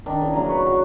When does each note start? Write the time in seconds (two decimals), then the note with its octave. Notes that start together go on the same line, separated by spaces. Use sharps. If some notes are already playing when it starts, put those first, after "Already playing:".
0.06 D#3 D4
0.21 C#3 E3
0.33 C#3 F#3 A#3
0.49 B4 C#6
0.66 F#4